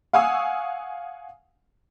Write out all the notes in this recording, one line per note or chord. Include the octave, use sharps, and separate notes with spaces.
F5 F#5 G#5 C#6 D#6 E6